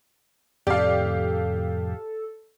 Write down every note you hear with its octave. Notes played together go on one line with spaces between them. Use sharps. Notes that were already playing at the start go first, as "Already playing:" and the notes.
F2 A2 C3 G4 A4 D5 F5